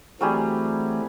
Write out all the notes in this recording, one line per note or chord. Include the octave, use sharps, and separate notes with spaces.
E3 F#3 G3 A3 C4 G#4